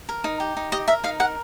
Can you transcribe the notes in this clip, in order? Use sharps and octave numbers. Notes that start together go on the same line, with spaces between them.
A#4
D#4
G4
D#4
G4 D#5
A#4 E5
D#4 F5
A#4 F#5